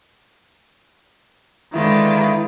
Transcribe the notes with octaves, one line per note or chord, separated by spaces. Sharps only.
D3 D#3 G#3 B3 E4 F4